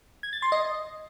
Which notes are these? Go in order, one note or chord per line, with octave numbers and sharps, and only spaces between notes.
G#6
A6
C6
D#5